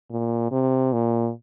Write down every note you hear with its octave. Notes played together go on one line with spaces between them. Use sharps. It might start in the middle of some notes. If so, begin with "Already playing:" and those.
A#2
C3
A#2